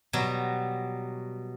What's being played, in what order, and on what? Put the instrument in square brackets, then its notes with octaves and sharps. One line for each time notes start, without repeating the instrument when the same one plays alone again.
[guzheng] B2 F#3 G3